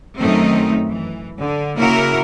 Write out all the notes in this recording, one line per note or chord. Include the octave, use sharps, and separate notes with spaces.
F#2 D#3 A3 C4 D#4
E3
D3
C#3 A#3 E4 F#4 A#4